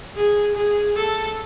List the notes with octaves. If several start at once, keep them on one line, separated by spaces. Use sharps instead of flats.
G#4
G#4
A4